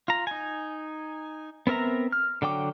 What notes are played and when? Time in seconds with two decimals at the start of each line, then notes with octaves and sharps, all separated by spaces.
0.08 F4 A#5
0.27 D#4 G#5
1.67 B3 C4 A#4 E5 A#5
2.12 F6
2.42 D3 F#3 G5 D6